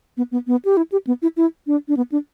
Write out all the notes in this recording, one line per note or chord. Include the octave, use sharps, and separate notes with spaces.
B3
B3
B3
G4
E4
G4
B3
E4
E4
D4
D4
B3
D4